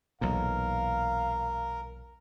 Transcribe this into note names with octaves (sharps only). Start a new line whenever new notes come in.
B1 E2 A#2 A#4 F5